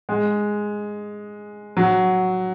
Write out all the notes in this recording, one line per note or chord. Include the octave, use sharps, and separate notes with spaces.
G#3
F#3